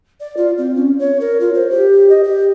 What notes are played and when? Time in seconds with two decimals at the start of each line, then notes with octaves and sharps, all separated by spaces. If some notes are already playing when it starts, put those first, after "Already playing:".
0.20 D5
0.37 F4
0.58 C4
0.76 C#4
0.99 C#5
1.21 A#4
1.40 F4
1.54 C5
1.71 G4
2.10 D#5
2.24 G4